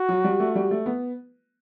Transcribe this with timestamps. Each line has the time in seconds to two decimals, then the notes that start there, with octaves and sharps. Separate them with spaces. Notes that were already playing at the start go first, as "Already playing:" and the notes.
Already playing: F#4
0.09 F#3
0.24 G3
0.40 A3
0.55 G3
0.71 A3
0.86 B3